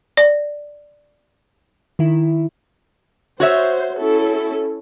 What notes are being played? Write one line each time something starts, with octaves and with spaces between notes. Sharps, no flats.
D5
D#3 E4
F#4 C5 C#5 E5
C#4 E4 A4